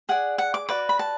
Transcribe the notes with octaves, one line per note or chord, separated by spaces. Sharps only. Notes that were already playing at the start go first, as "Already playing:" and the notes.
G#4 D5 F#5
F#5
D6
F#4 B4 D5 D6
B5
A5